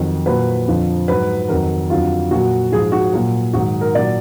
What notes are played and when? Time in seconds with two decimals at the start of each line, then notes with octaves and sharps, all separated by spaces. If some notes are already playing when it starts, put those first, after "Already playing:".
Already playing: F2 D#3 F#3
0.26 A#2 F#3 B4
0.68 F2 D3 F3
1.08 G#2 F#3 B4
1.49 F2 D#3 F#3 A#4
1.90 F2 D3 F#3 F4
2.31 A#2 F#3 F#4
2.72 G#2 F3 G#4
2.92 F#4
3.13 A#2 F#3
3.53 G#2 D#3 F#3 F#4
3.81 A#4
3.94 A#2 F#3 D5